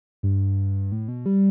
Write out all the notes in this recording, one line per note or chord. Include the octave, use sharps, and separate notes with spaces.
G2
A2
B2
G3